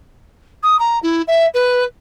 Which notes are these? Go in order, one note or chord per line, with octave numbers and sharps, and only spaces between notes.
D#6
A#5
E4
E5
B4